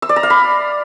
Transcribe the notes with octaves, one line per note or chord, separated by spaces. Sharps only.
E6
D5
A#5
F5
B5